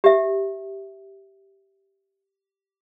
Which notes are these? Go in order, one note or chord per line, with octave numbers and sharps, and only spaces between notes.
G4 E5